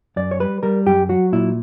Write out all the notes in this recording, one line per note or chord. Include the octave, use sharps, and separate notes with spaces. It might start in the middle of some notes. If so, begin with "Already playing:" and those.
F#2 D5
C#5
G3 B4
G3 A#4
F#2 G4
F#3 F#4
A#2 E4